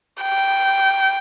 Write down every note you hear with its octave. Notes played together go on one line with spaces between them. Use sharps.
G5